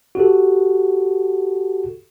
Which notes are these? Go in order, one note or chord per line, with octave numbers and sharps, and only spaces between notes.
F#4 G4 A4